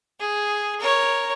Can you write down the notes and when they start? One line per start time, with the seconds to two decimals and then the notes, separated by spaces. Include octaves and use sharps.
0.19 G#4
0.80 A#4 C#5